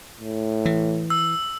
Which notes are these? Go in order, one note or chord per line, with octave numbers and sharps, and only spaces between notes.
A2
E3
E6